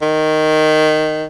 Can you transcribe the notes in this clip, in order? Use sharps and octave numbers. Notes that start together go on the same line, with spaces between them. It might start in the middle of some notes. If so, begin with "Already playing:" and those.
D#3